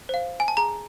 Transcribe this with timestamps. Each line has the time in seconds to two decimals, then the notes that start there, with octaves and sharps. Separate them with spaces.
0.09 C5 F5
0.40 G#5
0.48 A5
0.57 G#4 A#5